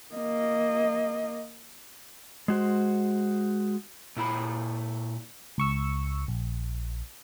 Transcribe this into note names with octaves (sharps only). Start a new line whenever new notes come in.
A#3 D#5
G#3 F#4 C5
A#2 E4 B5
C#2 C#6 E6
A#1